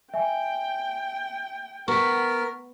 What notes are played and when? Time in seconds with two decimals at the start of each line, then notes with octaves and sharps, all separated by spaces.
0.14 E5 G5 G#5
1.88 B3 A#4 C#6 B6